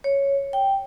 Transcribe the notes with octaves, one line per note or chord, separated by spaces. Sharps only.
C#5
G5